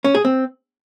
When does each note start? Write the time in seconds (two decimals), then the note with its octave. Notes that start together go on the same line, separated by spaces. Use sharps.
0.04 C#4
0.15 G#4
0.25 C4